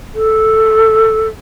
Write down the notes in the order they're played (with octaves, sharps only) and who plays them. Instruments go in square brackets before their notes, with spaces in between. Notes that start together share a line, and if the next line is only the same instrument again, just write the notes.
[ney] A4